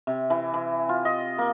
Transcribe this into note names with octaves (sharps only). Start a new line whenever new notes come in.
C3
E3
E3
F4
D#5
A#3